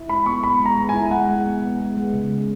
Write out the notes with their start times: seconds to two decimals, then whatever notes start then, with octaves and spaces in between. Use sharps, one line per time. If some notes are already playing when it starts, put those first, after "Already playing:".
Already playing: E4
0.09 G#3 B5
0.26 B3 C#6
0.43 B3 B5
0.60 G#3
0.66 A#5
0.77 G#3
0.89 E4 G#5
1.11 G#3 F#5
1.28 G#3
1.46 B3
1.62 B3
1.80 G#3
1.97 G#3
2.13 C#3
2.30 G#3